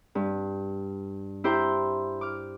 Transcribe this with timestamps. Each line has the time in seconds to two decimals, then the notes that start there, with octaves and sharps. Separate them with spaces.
0.15 G2
1.44 E4 G4 C5 G5 A#5 C6
2.21 D6 F6